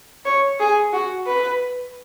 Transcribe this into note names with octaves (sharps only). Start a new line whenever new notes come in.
C#5
G#4
F#4
B4